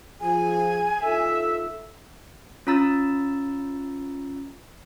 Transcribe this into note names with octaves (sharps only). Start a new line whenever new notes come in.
F3 G#4 G#5
D#4 F4 A4 E5
C#4 F4 A#5 E6 A6